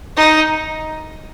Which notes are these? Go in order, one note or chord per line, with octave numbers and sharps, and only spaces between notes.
D#4